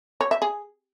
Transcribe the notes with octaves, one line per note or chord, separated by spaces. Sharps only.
C#5
E5
G#4